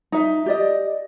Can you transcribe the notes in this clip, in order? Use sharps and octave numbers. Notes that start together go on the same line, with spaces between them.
D#4 E5
G4 D5 D#5